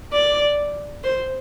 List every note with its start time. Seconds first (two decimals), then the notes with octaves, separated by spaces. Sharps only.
0.13 D5
1.04 C5